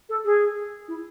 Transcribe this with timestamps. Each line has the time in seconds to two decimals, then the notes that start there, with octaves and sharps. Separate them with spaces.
0.09 A4
0.24 G#4
0.88 E4